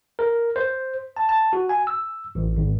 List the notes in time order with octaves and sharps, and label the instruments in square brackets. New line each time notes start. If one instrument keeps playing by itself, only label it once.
[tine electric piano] A#4
C5
A5
A5
F#4
G#5
E6
A1
G#1